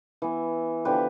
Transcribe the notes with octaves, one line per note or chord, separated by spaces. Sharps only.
E3 B3
D3 F3 B3 G4 B4